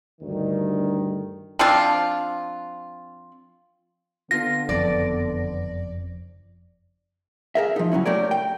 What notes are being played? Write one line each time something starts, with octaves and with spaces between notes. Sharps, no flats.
D2 G2 D#3
F3 C4 D4 F4
D3 B3 F4 A#6
F#1 F2 D5
G#4 A#4 E5
F3 D#4
C#3 F#3 C#4 E4
A3 G4 A#4 C#5 D5
G5